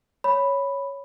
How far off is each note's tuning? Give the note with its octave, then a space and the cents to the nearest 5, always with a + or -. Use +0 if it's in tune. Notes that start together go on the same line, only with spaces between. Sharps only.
C#5 +0 B5 +0